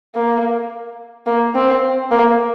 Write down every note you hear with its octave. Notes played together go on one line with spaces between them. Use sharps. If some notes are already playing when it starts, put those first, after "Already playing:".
A#3
A#3
C4
A#3